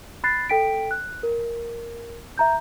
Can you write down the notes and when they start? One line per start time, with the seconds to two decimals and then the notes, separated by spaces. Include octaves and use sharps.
0.24 B5 F#6 A6 C7
0.49 A4 G5 B6 D7
0.91 F#6
1.23 A#4
2.38 E5 A#5 G6